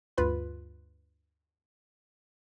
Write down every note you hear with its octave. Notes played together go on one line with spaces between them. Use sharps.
D2 G2 F4 B4 B5